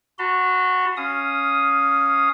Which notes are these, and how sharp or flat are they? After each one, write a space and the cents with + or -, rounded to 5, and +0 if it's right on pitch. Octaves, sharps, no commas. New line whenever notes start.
F#4 -10 A5 +35 C6 -45
C#4 +0 F5 +0 D#6 +0